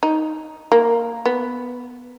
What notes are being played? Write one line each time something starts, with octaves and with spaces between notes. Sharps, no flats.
D#4
A#3
B3